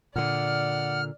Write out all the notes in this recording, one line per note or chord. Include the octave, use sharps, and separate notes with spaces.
A#2 D3 D5 F#5 F6